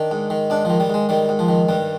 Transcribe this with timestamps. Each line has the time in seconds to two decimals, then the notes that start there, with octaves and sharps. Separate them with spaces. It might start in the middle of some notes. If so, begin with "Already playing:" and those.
Already playing: D#3 D4
0.11 G#2
0.30 D#3
0.50 G#2 D4
0.65 D#3 F3
0.80 G3
0.90 G#2 G#3
1.09 D#3 G3
1.29 G#2
1.39 F3
1.48 D#3
1.69 G2 G3